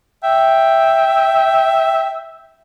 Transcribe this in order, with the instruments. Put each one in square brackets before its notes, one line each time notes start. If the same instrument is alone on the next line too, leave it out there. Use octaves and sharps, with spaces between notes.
[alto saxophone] E5 [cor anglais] G5